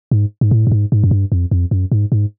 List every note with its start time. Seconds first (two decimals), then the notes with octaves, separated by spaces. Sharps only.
0.11 G#2
0.41 G#2
0.51 A2
0.67 G2
0.72 G#2
0.92 G#2
1.04 F#2
1.11 G2
1.32 F2
1.51 F2
1.71 F#2
1.92 G#2
2.12 G#2